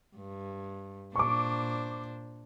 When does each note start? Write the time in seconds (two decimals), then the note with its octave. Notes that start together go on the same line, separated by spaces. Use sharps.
0.16 G2
1.16 A#2 D4 C5 C#6 D6